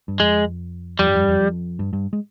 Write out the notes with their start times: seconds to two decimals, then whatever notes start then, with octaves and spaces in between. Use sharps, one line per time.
0.08 G2
0.20 F2 G#3
0.99 F2 G3
1.07 G2
1.14 F2
1.21 G2
1.29 F2
1.39 F2
1.79 G2
1.93 G2
2.13 G#3